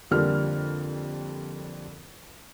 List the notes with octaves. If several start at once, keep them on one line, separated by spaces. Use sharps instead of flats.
F2 D3 G3 A#3 F6